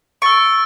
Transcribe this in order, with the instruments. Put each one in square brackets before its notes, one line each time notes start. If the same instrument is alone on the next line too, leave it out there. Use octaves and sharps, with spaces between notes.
[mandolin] C#6 [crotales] E6 A6 D7